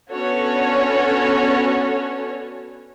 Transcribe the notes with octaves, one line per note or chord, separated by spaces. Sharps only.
B3 C#4 D4 F#4 A4 C#5